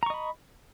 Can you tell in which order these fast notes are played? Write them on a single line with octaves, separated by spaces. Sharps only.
A#5 C#6 D#5 B5